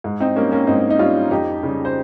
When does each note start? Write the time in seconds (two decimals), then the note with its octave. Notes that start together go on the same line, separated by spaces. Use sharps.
0.04 G#2
0.20 C4 D#4
0.35 G3 A#3 C#4
0.52 A#3 C#4
0.67 G#2 C4 D#4
0.90 D#4
0.99 G3 C#4 F4
1.31 F2 D#4 G4
1.63 C#3 G3
1.85 C5